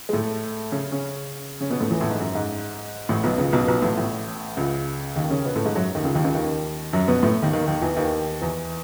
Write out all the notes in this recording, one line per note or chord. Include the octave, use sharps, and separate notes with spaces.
G#3
A2 A3
C#3 C#4
C#3 C#4
C#3 C#4
B2 B3
A2 A3
E2 E3
A1 A2
G#2
F#2
G#2
A1 A2
B1 B2
C#2 C#3
B1 B2
B1 B2
A1 A2
A1 A2
C#2 C#3
D#2 D#3
C#3 C#4
B2 B3
A2 A3
G#2 G#3
F#2 F#3
D#2 D#3
C#2 C#3
D#2 D#3
C#2 C#3
D#2 D#3
F#2 F#3
B2 B3
A2 A3
D#2 D#3
D#2 D#3
D#2 D#3
E2 E3
D#2 D#3
E2 E3